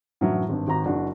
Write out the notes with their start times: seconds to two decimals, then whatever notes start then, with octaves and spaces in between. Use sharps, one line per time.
0.21 F#2 A2 D3 E3 F#3
0.49 G#1 G2
0.68 G#1 F#4 A#5
0.85 F#1 D4 F#4